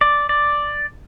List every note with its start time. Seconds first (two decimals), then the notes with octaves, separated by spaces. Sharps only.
0.01 D5
0.29 D5